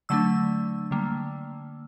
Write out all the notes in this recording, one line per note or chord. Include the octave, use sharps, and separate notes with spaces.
D3 F#3 A3 D4 E6
D3 G3 A#3